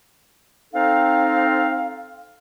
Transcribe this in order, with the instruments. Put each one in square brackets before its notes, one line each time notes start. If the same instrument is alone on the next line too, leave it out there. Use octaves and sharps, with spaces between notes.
[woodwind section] C4 D#4 A4 F5